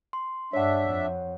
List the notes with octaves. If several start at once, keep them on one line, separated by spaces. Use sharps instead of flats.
C6
G2 D4 C#5 E5 F#5
F2